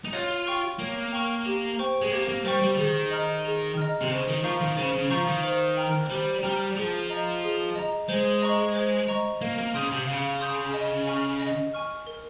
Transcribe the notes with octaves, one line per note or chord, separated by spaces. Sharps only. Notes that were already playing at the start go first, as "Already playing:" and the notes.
D#4
F4 C#5
G5 C#6 F6
A#3 C#5
G5 C#6 F6
G4
C5 G5 C#6
G#3
A#3 G4
A#3
G3 C5 G5 C#6
G3
D#3 G#4
D#5 A#5 F6
G#4
D#5 A#5 F6
C3
C#3 C5
D#3
F3 F5 A#5 C#6 G6
D#3
C#3 C5
C#3
F3 F5 A#5 C#6 G6
D#3
C5
G5 A#5 F6
G3 C5
G3 G5 A#5 F6
F3 G#4
D#5 A#5
G#4
D#5 A#5
G#3 C5
D#5 A#5 C#6
C5
D#5 A#5 C#6
A#3 F5
A#3
C#3 C6 D#6 G6
C3
C#3 F5
C6 D#6 G6
D#5
G#5 C#6 F6
D#5
G#5 C#6 F6
A#4